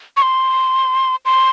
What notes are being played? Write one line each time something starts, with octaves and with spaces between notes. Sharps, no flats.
C#6
C6
C6